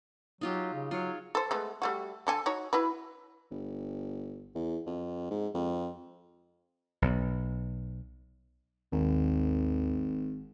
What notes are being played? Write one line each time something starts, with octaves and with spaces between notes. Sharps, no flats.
F#3 D#4 F4 G4
C#3
F#3 F4 G#4 C#5
A4 C5
G#3 A3 B3
G3 A3 F#4
D3 A4 G#5
D#4 F#4 C#5
E4 F#4 B4
G1
E2
F2
G#2
F2
B1
G#1 D#2